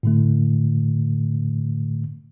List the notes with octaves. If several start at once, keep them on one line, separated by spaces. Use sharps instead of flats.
A2 D3 A3